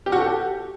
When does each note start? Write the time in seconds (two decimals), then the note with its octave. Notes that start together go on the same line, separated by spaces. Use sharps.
0.06 G4
0.12 F#4
0.18 A4
0.24 G4